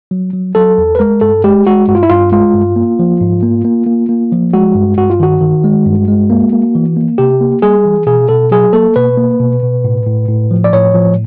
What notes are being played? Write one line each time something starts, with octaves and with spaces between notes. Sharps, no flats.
F#3
F#3
F#3 A4
E2
B4
G#3 A#4
G2 A4
G#3 G4
G#3 F#4
G2 F#4
F4
E4
G2 F4
G#3 F4
G2
A#3
F3
G#2
A#3
A#3
A#3
A#3
F3
G#3 F#4
G2
G2 F#4
F4
D#3 F#4
D#3
G#3
G2
G#3
A#3
A#3
E3
A#3
C3 G4
A#3
G3 G#4
E3
B2 G#4
B2 A4
F#3 G#4
A#3 A4
B2 B4
A#3
B2
B2
A2
A2
A2
F3
D5
A2 C#5
F3